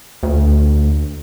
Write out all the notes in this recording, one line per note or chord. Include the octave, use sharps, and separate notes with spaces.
D2